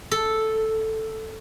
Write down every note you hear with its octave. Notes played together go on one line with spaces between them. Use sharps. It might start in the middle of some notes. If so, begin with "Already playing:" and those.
A4